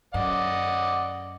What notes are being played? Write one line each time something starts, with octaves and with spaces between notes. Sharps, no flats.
F#2 D5 D#5 F#5